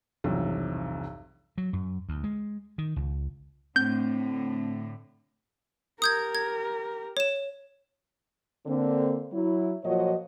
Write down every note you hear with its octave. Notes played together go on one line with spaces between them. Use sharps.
B1 E2 G2 C3 F3 G3
F#3
F#2
D2
G#3
D#3
C#2
A2 D3 C4 G6
G4 A#4 D#6 G6 G#6
G#6
C#5 E7
D3 A#3 C4
F#3 E4
A#2 F3 F#3 F#4 C#5 D#5